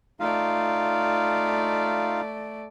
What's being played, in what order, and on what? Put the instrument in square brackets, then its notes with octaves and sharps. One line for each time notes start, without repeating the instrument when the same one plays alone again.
[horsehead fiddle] A3 D5 [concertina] D#4 F4 F5